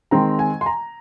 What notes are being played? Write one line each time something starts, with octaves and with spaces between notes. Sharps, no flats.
D#3 G#3 C4 A#5
G#5
C6
A#5